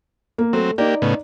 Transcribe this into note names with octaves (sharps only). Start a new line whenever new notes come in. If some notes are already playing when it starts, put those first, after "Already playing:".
A#3
F#3 A3 C4
A#3 D#4 G4 D5
A2 C#3 B3